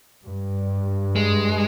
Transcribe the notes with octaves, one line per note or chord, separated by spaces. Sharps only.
G2
G#3